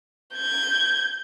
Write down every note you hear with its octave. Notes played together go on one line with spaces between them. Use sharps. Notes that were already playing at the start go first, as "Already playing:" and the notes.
G6 G#6